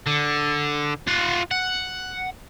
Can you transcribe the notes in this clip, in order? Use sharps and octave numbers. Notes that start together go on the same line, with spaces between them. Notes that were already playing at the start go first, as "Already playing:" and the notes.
D3
F4 F#5
F#5